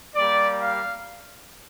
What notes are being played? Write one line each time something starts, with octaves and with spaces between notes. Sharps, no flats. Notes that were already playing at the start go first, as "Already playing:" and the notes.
G3 A#3 G4 D5
F5